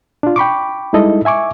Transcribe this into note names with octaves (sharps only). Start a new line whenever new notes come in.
D4 F4
G5 B5 C#6 D6
G3 G#3 D#4 E4 A4 D#5
E5 G#5 C#6 D6